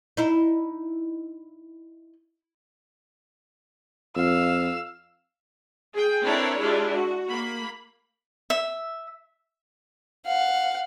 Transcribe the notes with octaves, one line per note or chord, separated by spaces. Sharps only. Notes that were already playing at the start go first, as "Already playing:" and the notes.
D#4 E4
F2 F5 E6
G#4 G5
C4 D4 E4 A4 A#4 C#5
G#3 D4 E4 F4 G4
F#4
A#3 B5
E5
F5 F#5